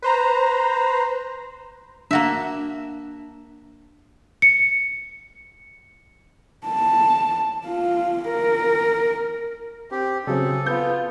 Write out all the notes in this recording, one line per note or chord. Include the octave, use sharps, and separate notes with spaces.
B4 C5 A#5
A#3 D4 F#4 E5
C#7
A5
F4
A#4
C4 G4
C#3 F#3 C4 G#4 A4
B3 F4 G6